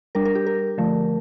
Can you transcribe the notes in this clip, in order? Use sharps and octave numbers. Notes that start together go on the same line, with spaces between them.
G3 D4 A#4
A#4
G4
A#4
D3 F3 A3